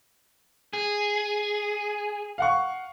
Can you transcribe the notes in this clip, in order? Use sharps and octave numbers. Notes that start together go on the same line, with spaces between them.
G#4
F5 F#5 C#6